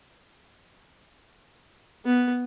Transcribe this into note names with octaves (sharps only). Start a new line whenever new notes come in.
B3